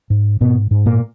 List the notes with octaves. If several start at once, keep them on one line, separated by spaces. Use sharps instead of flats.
G#2
G#2 B2 B3
G#2
A#2 A#3